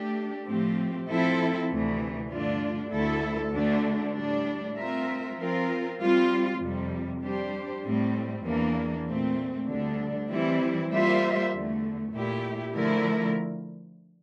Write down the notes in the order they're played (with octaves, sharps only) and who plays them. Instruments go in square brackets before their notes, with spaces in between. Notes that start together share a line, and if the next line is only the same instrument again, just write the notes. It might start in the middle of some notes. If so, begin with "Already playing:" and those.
Already playing: [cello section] A3 D4 G4
A2 F3 A3 C4 G4
F3 C4 E4 A4
D2 C3 E3 A3
G2 D3 A3 D4 F4
D2 D3 A3 E4 A4
D2 D3 A3 D4
A2 G3 D4
A3 C4 F4 A#4 E5
F3 C4 F4 A#4
G3 C4 F4
F2 C3 G3
G3 D4 G4 C5
A2 G3 C4
E2 E3 A#3 D4
A#2 A3 C4
D2 D3 G3 D4
E3 G3 C4 E4
G3 A#3 F4 C5 E5
E2 D3 A3
A#2 A3 E4 G4
D3 F3 A3 E4 A#4